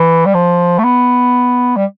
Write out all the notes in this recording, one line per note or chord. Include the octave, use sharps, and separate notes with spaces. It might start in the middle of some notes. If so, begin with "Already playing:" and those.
Already playing: E3
G3
F3
A3
B3
G3